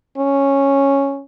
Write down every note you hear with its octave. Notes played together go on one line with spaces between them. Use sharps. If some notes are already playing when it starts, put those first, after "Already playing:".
C#4